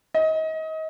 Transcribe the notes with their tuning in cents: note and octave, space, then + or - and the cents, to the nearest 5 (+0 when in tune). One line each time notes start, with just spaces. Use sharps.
D#5 +30